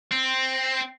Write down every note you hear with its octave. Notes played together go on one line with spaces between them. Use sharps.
C4